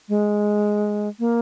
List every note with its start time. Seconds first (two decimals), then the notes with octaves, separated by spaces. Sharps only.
0.09 G#3
1.19 A#3